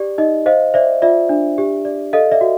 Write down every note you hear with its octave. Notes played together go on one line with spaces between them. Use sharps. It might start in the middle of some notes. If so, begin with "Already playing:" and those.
Already playing: G4 D5
D#4 D#5
C5 D#5 F5
C5 D5 E5
F4 D5 E5
D4
G4
D5
A4 D#5 F5
D5 E5
F#4